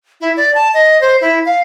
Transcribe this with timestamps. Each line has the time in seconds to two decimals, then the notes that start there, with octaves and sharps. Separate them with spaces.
0.21 E4
0.37 D5
0.55 A5
0.74 D#5
1.01 C5
1.21 E4
1.45 F5